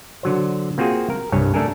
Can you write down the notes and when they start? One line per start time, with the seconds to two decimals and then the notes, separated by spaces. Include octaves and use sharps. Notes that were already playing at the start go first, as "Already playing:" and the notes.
0.23 D3 F#3 C5
0.78 A#3 C4 F4 F#4 G#4
1.10 A#4
1.32 C2 G2 C#5 G#5
1.54 A3 D4 A4 A#4 G#5